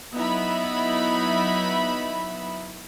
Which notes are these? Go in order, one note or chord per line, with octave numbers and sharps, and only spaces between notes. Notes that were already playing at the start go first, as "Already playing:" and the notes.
F#3 B3 D#4 E4 E5 B5